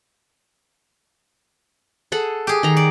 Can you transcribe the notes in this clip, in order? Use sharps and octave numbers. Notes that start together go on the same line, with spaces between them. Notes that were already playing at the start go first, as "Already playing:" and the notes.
G#4 A4 F#5
G4 G#4
D#3 A#5
D5